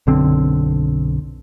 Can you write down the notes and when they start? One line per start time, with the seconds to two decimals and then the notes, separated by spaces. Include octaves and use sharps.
0.07 B1 F#2 D3 C4